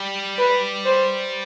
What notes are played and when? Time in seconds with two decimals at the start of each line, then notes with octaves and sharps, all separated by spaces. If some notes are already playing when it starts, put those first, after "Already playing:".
Already playing: G3
0.38 B4
0.85 C5